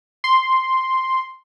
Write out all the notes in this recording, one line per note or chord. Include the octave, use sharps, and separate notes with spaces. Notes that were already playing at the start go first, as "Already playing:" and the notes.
C6